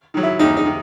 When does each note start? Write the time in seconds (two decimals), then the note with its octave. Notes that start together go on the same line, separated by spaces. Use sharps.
0.14 D#3 F#3
0.23 E4
0.39 D#2 D#4
0.57 D#4
0.65 D#3